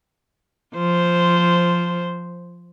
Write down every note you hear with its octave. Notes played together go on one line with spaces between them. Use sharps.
F3 C5